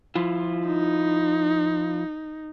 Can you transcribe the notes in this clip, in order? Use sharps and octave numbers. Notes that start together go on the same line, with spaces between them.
F3 E4 F4
D#4